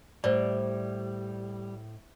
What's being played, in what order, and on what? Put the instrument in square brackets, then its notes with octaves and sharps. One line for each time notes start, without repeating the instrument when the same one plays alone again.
[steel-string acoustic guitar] A2 [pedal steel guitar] G3 [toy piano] C5 D5